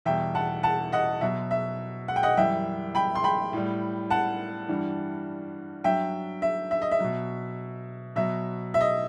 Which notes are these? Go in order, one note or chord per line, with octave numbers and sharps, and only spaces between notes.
E2 B2 G3 E5 G5
F#5 A5
F#5 A5
D#5 F#5
B2 F#3 E5
E5
F#5
G5
D#5 F#5
F#2 E3 G3 E5 G5
G5 B5
C6
G5 B5
A2 G3
F#5 A5
G2 E3 G3
G2 F#3 E5 G5
E5
E5
D#5
E5
B2 F#3
B2 F#3 E5
E5
D#5